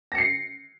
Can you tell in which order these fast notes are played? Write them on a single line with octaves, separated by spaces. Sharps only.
A#6 C#7 C7